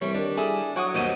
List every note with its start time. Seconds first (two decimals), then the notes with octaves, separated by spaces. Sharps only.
0.02 C2 E3 G3 C#5
0.15 D#3 D4 C#5
0.37 E4 G#4 A4
0.76 F#3 F#5 C#6 D#6
0.94 D#2 B2 G3 C5 D#5